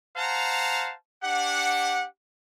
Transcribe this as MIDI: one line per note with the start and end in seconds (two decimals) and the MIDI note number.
0.16 0.94 72
0.16 0.94 77
0.16 0.94 78
0.16 0.94 81
0.16 0.94 82
1.23 2.06 62
1.23 2.06 67
1.23 2.06 78